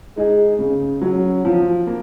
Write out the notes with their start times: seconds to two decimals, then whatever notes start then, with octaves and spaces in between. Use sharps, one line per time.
0.16 G#3 D#4 G#4
0.59 C#3
1.01 F#3 C#4
1.45 F3
1.87 A#3